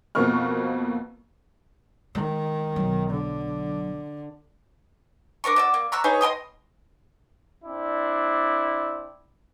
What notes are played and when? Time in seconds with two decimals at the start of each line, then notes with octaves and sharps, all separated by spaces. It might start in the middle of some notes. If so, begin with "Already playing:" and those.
0.15 F2 B2 A#3 C4 C#6 F6
2.15 D#3 G#3
2.76 B1 F#3
3.10 D3
5.44 D4 A#4 D5 C#6
5.56 F#4 D5 E6
5.74 A#3
5.92 A#5 C#6 E6 F#6
6.04 D#4 G#4 B4 C#5
6.21 D#5 G5 C6 D#6
7.65 C4 D4 E4 D5